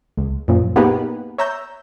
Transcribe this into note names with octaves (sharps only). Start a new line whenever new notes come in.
C#2
F#2 A#2 F3
A#3 B3 D#4 G4 G#4 B4
C#5 E5 A#5 E6 G6